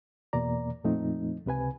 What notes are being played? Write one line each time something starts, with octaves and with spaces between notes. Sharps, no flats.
E2 B2 A#3 D5 A#5
F2 A#2 F3 A3 C4 D#4
C#2 C3 B4 G#5